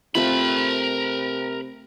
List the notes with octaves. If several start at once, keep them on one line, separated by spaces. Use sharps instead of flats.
C3 A3 C4 F4 A#4 B5